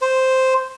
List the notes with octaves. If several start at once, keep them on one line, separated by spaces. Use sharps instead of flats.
C5